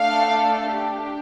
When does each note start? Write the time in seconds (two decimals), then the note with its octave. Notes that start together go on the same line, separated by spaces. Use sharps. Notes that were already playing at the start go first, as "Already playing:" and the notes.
Already playing: A3 D4 A4 F5
0.69 D4 G4